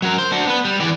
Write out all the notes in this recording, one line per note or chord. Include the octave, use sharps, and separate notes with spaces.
F#3 A#4
C5
D4 F#4
B3 B4
G3
E3 D5